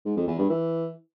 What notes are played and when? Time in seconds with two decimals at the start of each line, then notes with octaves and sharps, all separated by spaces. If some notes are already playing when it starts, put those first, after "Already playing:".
0.06 G#2
0.17 F2
0.28 E2
0.39 G2
0.50 E3